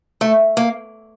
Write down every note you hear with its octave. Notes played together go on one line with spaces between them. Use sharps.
A3
A#3